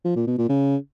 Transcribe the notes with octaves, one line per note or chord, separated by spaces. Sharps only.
F3
A#2
B2
A#2
C#3